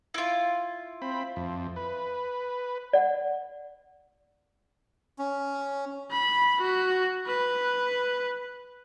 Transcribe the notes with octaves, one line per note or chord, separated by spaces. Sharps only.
E4 F4
C4 B5
F2
B4
D5 F#5
C#4
B5
F#4
B4